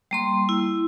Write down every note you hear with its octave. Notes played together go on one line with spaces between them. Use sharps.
G3 A#3 C6
E4